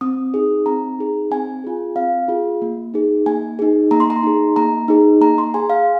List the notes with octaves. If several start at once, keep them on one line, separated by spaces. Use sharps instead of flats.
C4 D#6
D#4 G#4
C4 A#5
D#4 G#4
C4 G#5
F4 G#4
C4 F5
F4 G#4
A#3
D#4 G#4
A#3 G#5
D#4 G#4
A#3 A#5
C6
A#5
D#4 G#4
A#3 A#5
D#4 G#4
A#3 A#5
C6
G#4 G#5
F5